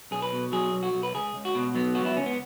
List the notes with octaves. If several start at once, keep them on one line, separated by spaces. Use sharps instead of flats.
B1 G#4
B4
B2
F#3 G#4
B1
F#4
B1
B4
C#2 G#4
C#2
F#4
B2
F#3 B3
C#2 F#4
E4
C#2 C#4
B3